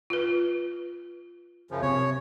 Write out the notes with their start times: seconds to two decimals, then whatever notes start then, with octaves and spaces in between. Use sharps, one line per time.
0.10 F4 B4
1.71 F#2 C#3 F3
1.82 C3 C#5